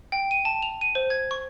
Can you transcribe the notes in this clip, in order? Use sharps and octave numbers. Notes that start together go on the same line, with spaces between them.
G5
D#7
A5
F7
D#7
C5
G#6
C#6